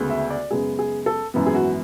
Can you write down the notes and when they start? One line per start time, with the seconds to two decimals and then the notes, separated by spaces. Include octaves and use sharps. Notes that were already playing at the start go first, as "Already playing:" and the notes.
Already playing: D2 C#3 G#3 B3
0.10 E5
0.30 D5
0.51 F#2 C#3 G#3 B3 G#4
0.79 G#4
1.06 A4
1.34 G#1 F#2 E3 B3
1.46 G#4
1.55 F#4